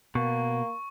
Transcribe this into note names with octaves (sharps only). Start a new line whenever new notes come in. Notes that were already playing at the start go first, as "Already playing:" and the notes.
B2 A#3 C#6